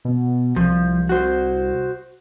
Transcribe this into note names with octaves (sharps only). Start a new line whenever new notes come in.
B2
C2 F3
F#4 C5